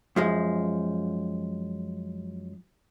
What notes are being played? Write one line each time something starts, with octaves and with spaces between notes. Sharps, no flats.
F#2 F3 G#3